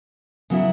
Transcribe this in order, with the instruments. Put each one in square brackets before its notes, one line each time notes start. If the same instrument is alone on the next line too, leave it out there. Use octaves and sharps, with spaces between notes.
[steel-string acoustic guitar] C#3 F#3 B3 E4